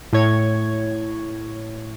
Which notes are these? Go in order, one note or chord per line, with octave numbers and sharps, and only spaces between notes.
A2 C#5 G#6